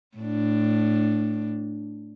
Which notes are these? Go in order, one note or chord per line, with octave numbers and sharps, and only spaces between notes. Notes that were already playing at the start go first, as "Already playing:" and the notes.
A2 D4